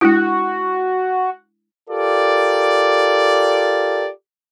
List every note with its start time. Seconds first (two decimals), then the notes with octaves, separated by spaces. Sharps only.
0.01 G#3 D4 E4 F#4
1.90 F4 G4 A4 A#4 D5